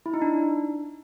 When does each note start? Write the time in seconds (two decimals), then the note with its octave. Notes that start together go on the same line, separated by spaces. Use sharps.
0.06 E4
0.14 D#4
0.22 D4